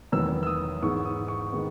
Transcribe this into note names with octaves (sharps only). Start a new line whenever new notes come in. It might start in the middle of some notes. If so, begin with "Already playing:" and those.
E2 D#3 F#3 B3 E6
E6
D#6
G#2 E3 G#3 B3 C#6
D#6
C#6
D#3 G#3 B3